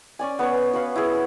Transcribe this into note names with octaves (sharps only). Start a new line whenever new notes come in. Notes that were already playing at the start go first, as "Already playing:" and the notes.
C#4 D5 G#5
B3 B4 C#5
F#4 B4 F5
E4 G#4